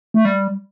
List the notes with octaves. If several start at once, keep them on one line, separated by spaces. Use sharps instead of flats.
A3
G3